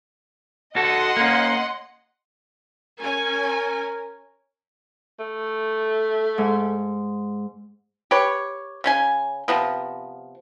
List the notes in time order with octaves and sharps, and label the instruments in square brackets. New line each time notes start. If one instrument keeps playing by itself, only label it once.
[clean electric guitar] F#4 A4 [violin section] D#5 F#5 C6
[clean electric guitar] A#3 C#4
[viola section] C#4 G#5 [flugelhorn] A#4
[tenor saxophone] A3
[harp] G#2
[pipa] G4 B4 C#5
C#3 C#4 G#5
C3 F3 B3